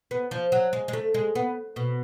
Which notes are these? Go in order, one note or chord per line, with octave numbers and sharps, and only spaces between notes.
B3
F3
F#3
G#3
G#3
A3
G#3
B3
B2